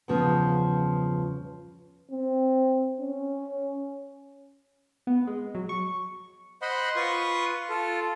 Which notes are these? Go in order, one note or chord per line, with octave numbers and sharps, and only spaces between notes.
E2 G2 C#3 F3 B3
C4
C#4
B3
G#3
F#3
C#6
C5 D#5 F#5 B5 C6
F4 B4 C6 C#6 D#6
F4 A4